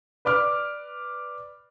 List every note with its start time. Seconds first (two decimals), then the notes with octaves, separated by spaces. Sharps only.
0.25 B4 D5 D6 F6